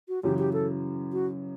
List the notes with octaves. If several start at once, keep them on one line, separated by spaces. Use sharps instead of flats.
F#4
F#2 C#3 E3 G4
G4
A4
F#4